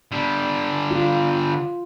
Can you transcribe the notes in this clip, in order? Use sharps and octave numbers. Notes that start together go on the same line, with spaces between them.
D3 G3
F4